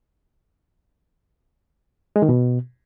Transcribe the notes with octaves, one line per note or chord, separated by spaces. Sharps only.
G#3
D#3
B2